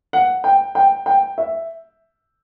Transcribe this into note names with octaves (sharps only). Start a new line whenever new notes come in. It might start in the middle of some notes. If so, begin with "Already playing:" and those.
F#5
G5
G5
G5
E5